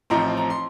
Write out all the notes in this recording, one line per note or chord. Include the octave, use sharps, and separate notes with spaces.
A1 A2 F3 C4 D#4 A#5
A#5
C6